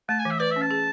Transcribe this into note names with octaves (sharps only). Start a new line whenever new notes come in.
A3 A5
G#5
E3
E5
B4 D5
E5
C#4
A5
G#4